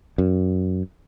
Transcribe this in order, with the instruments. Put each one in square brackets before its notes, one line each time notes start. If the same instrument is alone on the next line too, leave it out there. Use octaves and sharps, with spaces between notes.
[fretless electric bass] F#2